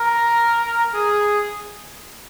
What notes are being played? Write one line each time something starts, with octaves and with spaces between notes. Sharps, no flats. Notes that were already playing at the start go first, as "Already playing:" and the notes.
Already playing: A#4
G#4